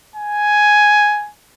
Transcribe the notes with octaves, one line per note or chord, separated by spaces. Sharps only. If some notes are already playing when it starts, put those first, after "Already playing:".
G#5